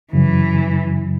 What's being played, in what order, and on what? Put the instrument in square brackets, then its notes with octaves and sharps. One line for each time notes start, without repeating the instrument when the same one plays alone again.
[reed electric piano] F#2 C#3 F#3 [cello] E3